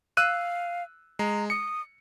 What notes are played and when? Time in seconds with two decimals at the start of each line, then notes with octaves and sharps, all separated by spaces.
0.17 F5 E6 F#6 D#7
1.19 G#3 A#5
1.50 D#6 C#7